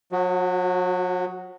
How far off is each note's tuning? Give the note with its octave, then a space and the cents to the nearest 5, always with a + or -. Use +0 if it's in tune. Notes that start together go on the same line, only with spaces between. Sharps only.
F#3 -40 F#4 +0